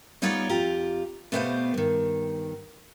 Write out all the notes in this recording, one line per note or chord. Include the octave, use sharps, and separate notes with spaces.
G3 B3 D#4 F4 C#5 D5
F2 F4 G4 A#5
B2 A3 B3 G4 C5 F5
G2 D#3